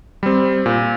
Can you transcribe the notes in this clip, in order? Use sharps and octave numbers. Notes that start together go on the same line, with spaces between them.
G3 C4
A#2